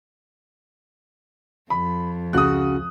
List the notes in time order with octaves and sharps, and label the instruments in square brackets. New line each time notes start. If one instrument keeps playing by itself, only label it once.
[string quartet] F2 [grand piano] B5
[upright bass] C#2 [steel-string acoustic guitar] C#3 F#4 [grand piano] D#6 F#6